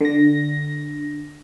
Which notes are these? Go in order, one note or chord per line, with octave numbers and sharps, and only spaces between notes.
D3 A#6